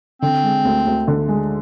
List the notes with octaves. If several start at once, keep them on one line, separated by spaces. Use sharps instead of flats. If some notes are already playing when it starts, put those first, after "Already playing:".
D3 C4
G#3
D2
D2
D3
G#3